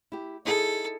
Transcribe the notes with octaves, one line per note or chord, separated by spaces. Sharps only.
E4 G4
D#4 E4 G#4 A4